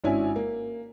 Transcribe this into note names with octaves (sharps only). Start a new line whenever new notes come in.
G#1 C#4 D4 E4 G#5
A#3